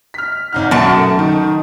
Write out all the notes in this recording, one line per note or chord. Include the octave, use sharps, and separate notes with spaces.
F6 B6
G#1 D#4 F#5 F6
F#2 B2 A5 D7
A3 A#4
D#3 D#4